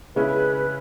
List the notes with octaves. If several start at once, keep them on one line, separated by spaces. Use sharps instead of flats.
C#3 G#3 C#4 E4 B4